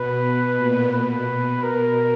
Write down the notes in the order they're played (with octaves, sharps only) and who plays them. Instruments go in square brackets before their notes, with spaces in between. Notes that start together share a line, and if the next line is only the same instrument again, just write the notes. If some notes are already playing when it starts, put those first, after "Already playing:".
Already playing: [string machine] B2 [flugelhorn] B4
[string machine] A#2
[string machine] B2 [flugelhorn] B4
[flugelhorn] A#4